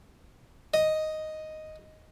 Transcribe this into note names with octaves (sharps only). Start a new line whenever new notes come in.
D#5